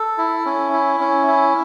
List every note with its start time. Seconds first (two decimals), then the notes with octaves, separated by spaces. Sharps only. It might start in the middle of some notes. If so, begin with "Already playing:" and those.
Already playing: A4
0.18 E4
0.45 C#4
0.73 E4
1.00 C#4
1.27 E4